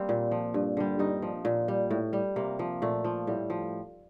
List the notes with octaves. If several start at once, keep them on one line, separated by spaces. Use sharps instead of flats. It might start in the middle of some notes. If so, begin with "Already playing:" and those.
Already playing: G3 A#3 C4
A#2
F3
G2
D3 G3
G2 D#4
F3
A#2
G3
A2
G3
C3 A#3
F3
A#2 A3
F3
A2 G3
F3